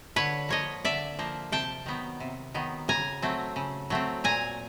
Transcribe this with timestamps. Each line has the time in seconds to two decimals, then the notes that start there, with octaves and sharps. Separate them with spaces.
0.16 D3 B4 C#5
0.49 F3 A#3 C#5 D#5
0.85 D3 D5 E5
1.19 F3 A#3
1.52 C3 G5 A5
1.86 D#3 F#3 B3
2.20 C3
2.54 D#3 F#3 B3
2.88 C#3 G#5 A#5
3.22 F#3 A3 C4
3.56 C#3
3.90 F#3 A3 C4
4.24 A#2 G#5 A#5